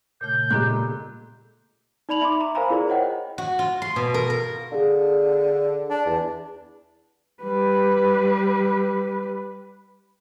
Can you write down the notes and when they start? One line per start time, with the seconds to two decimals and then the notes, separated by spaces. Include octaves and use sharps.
0.21 A#2 C#3 A3 G6
0.51 A#2 G#3 B3 G4 A4 A#5 F#6
2.09 D#4 D5 B5 F7 F#7
2.21 E5 B5 C6 D6
2.41 A#5
2.55 A#4 C5 F5 G#5 A#5 B5
2.70 E4 F4 G#4 A#4 D5
2.87 C5 C#5 D#5 F#5 G5
3.38 F#4
3.59 F4
3.82 C6
3.96 B2
4.14 A#4
4.30 A#4
4.72 D3 G#4 F5
5.90 D4
6.06 E2
7.43 G3 B4